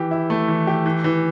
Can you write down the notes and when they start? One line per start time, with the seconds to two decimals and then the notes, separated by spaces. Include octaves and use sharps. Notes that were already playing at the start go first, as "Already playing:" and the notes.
Already playing: E3 G4
0.11 E4
0.30 A3
0.48 E3
0.67 G4
0.86 E3
1.04 E3